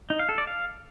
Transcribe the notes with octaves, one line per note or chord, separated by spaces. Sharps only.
D#4
F5
A4
D5
F5